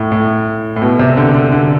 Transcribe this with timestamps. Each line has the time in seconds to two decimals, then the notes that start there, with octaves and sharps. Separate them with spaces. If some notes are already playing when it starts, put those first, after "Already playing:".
Already playing: A2
0.12 A2
0.76 A2
0.82 B2
0.99 C3
1.17 D3
1.34 D3
1.52 D3